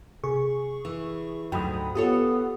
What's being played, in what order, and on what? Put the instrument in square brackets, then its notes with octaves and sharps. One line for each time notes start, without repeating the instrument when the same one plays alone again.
[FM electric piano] C3 G#4 C#6
[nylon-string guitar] E3
[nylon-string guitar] D2 G#2 F#3 [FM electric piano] G5 B5 D#6
[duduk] B3 [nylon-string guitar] F4 A4 C#5 [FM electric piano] G4 D#6